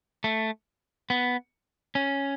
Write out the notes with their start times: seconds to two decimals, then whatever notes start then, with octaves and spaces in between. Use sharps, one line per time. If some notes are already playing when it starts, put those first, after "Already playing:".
0.24 A3
1.10 B3
1.95 C#4